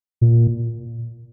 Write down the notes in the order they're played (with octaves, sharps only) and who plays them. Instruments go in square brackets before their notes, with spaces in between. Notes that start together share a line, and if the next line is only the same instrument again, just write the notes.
[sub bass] A#2